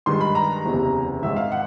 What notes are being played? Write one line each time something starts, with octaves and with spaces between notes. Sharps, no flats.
G2 D#3 G#3 C6
B5
A#5
F#1 E2 C3
G#1 G#2 D#3 E5
F5
F#5